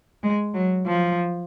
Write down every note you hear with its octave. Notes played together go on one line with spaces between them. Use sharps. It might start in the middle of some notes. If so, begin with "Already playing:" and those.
G#3
F#3
F3